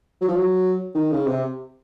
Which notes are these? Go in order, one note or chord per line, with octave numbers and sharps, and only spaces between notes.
F#3
F3
F#3
D#3
C#3
C3